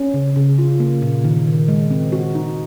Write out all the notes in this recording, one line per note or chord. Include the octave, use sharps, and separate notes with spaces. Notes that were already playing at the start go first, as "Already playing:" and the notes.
Already playing: C#4
C#3
C#3
F4
A#3
A#2
D#3
D#3
G#3
C4
F#4
D#4